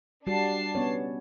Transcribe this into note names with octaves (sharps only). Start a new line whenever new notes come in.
G3 D4 F#4 A5 C7
B3 C#4 C#5